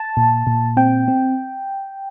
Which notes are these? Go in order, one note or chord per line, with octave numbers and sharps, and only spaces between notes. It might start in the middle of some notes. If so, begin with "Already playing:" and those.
Already playing: A5
A#2
A#2
C4 G5
C4